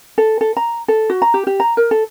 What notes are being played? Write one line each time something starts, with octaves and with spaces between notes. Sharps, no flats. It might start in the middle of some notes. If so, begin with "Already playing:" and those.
A4
A4
A#5
A4
F#4
A#5
G4
G4
A#5
A#4
A4